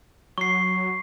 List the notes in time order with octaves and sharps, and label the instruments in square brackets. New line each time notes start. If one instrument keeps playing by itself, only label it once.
[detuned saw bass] F#3 [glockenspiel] C#6 C7